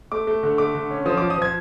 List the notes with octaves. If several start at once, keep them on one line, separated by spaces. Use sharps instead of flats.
A3 D6
A3
D3
A3 D6
D3
C#4
F3 D#6
D6
F3
D#6
F3 G#6